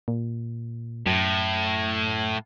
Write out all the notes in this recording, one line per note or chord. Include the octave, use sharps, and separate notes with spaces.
A#2
F#2 A2